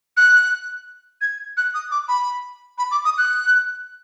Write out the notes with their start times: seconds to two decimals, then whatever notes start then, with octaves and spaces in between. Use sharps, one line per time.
0.17 F#6
1.21 G#6
1.57 F#6
1.74 D#6
1.91 D6
2.08 B5
2.78 B5
2.91 D6
3.05 D#6
3.18 F#6